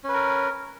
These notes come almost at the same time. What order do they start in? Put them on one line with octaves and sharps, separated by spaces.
C#4 B4 A#4